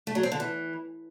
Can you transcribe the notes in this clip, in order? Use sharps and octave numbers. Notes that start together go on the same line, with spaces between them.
A3
F#3
C4
D3
E3